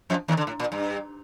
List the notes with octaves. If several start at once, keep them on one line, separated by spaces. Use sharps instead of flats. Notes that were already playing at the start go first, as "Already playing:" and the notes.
F2 F3
D#2 D#3
D3
A2
A#2
G2